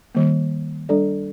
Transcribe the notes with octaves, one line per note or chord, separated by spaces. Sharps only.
D#3 G3 A#3
G3 D4 A4 D5